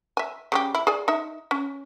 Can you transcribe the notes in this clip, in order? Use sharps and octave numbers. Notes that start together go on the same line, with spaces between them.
E5 G#5
C#3 G3 G4
E4
G#4 D5 G#5
D#4 E5
C#4